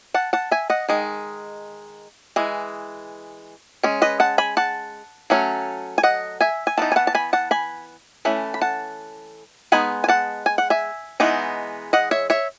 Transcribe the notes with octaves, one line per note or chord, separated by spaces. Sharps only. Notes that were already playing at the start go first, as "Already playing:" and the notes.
F#5 A5
F#5 A5
E5 G#5
D#5 F#5
D#3 G#3
E3 G#3
G#3 C#4
B4 D#5
F#5 A5
G#5 B5
F#5 A5
F#3 A3 C#4
G#5
D#5 F#5
E5 G#5
G#5
E3 B3 D#4 A5
G#5
F#5 A5
A5
G#5 B5
F#5 A5
G#5 B5
E3 A3 C#4 B5
B5
F#5 A5
G#3 B3 D#4 G#5 B5
G#5
F#5 A5
G#5
F#5
E5 G#5
E3 G#3 B3 D#4
D#5 F#5
C#5 E5
C#5 E5